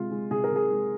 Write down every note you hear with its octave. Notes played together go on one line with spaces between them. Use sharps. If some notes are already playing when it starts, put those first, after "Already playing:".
Already playing: C3 G#3 F4
G#3
C3 G#4
A#4
C3 G#4
G#3